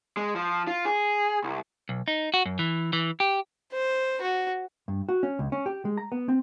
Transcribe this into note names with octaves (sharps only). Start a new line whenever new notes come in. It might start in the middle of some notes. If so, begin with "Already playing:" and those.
G#3
F3
F4
G#4
C2
B1
D#4
F#4
F#2
E3
E3
G4
C5
F#4
G2
F#4
C#4
C#2
C#4
G4
G#3
A#5
B3
C4